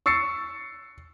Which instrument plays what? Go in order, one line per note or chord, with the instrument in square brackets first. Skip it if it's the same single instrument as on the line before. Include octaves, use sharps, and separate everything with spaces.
[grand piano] C#6 E6 A6 C7 C#7